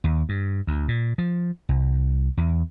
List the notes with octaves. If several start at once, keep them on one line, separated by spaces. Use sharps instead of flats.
D#2
G2
D2
A#2
F3
C2
E2